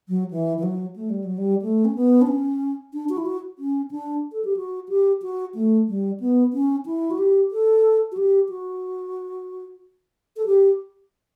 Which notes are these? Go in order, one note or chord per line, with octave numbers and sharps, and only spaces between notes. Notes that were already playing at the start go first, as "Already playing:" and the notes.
F#3
E3
E3
F#3
A3
G3
F#3
G3
A3
C#4
B3
D4
C#4
D4
F#4
E4
F#4
C#4
D4
A4
G4
F#4
G4
F#4
A3
G3
B3
C#4
E4
F#4
G4
A4
F#4
G4
F#4
A4
G4